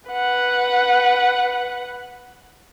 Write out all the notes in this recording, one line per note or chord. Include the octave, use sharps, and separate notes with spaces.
B4 F#5